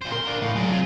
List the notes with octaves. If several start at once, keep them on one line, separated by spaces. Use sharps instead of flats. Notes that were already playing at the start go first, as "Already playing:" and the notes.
A#2 C5
A#4 C6
D4 F4
A2 F5
F#3 G#3 D5
C3 F4